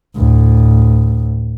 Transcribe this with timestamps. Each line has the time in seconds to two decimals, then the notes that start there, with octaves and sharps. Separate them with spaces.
0.16 D2 A2